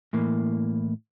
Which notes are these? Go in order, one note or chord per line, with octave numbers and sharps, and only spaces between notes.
A2 E3 A#3